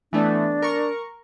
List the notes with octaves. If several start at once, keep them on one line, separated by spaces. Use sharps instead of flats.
E3 A3 B3 D4
A#4 C#6